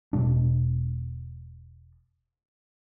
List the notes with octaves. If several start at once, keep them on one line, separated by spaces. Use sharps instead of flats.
E1 B2 G#3 D4